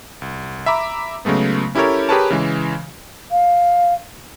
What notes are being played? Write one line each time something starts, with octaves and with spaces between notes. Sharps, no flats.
C2
E5 A#5 B5 D6
C#3 F#3 G#3 A3 B3
C#4 E4 G4 A4 A#4 C#5
G4 G#4 A#4 B4 C#5 A5
C#3 E3 G#3
F5